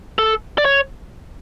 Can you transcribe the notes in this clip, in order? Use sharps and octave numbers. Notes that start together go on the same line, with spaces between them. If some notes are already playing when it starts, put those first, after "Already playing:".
A4
D5
C#5